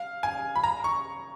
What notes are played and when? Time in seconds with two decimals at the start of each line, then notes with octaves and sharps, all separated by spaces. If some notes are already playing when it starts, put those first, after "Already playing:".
Already playing: F5
0.23 G#5
0.55 B5
0.63 A#5
0.84 C#6